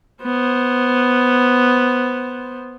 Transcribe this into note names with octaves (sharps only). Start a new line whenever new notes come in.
B3 C5